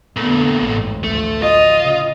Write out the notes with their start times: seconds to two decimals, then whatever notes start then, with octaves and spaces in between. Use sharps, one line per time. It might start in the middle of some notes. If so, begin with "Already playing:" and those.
0.16 F2 A#2 D3 A3 B3
0.62 A1 F2 G#2
1.04 A1 D2 F3 A3
1.42 F4 D#5
1.83 C#3